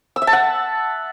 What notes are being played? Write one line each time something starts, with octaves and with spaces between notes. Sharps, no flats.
E6
E5
A5
F#5